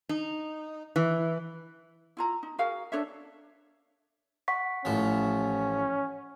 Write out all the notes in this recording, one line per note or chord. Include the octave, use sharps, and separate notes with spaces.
D#4
E3
E4 F4 A#5
D#4
F#4 G#4 A#4 F5
D4 A4 C#5 E5
F#5 C#6 B6
A1 F3 C#4